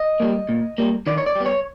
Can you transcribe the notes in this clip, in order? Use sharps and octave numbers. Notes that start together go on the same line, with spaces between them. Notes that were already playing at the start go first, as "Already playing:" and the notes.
Already playing: D#5
G3 A#3
A#2
G3 A#3
D#3 D5
C#5
D5
G3 B3
C#5